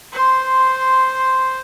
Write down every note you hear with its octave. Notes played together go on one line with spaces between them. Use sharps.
C5 C6